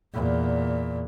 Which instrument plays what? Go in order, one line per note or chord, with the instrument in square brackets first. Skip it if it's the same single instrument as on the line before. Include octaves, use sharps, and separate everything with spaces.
[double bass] E2 A#2